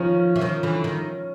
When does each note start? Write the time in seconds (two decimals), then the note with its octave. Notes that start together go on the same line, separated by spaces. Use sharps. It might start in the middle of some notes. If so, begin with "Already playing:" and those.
Already playing: D#3 F3 C#4
0.36 E3
0.41 D#3 F3
0.63 D3 E3
0.84 D#3